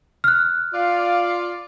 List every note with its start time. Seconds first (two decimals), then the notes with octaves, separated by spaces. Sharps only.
0.24 F6 F#6
0.73 F4 D5 F5